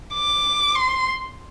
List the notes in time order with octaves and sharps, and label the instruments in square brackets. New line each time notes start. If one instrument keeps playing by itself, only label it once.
[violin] D6
C6